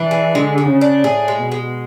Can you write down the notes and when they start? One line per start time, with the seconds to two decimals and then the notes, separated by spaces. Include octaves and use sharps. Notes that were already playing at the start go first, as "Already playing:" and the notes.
Already playing: E3 D4
0.11 G#4
0.34 D3 G#3
0.58 G#3
0.69 C#3
0.81 D4
1.04 A2 G#4
1.28 G#3
1.39 B2
1.52 G#3